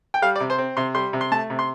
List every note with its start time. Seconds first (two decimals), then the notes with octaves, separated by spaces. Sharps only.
0.14 G5
0.22 G3 F5
0.36 D5
0.40 C3
0.50 C5
0.58 C4
0.77 C3 C6
0.95 G3 C6
1.13 C3
1.21 C6
1.32 A3 A5
1.50 C3
1.59 C6